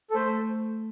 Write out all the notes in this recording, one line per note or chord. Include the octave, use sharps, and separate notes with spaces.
A4
A3 C5